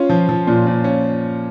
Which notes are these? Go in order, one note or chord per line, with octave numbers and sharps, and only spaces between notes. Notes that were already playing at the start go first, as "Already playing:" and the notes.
Already playing: C#4 F4
F3
F3
A#2
A#2
C#4